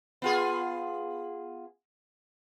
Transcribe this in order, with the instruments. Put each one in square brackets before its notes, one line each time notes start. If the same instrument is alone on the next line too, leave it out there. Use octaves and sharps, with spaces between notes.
[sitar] B3 F4 G#4